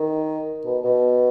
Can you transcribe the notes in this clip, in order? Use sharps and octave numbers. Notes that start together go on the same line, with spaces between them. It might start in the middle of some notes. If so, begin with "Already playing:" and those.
Already playing: D#3
B2
B2